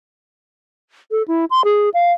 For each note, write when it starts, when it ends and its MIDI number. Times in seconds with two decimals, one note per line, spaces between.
1.11 1.23 69
1.28 1.45 64
1.51 1.64 84
1.64 1.89 68
1.94 2.12 77